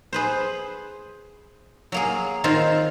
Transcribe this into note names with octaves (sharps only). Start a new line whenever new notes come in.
G#4 B4 C5
F#3 A#3 G#4
D#3 C4 F4 C5 C#5